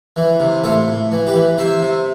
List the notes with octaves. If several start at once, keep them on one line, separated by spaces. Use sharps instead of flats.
E3
C3
A2 F4 A4
A2
E3
G4 B4
E3
C3 C5 E5
C3